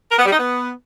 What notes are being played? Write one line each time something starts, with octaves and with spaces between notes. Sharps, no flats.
A#4
B3
G3
D#4
B3